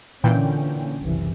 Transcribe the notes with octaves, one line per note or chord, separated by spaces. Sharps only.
A#2 D3 E3 C#4 G5
F#1 C2 E3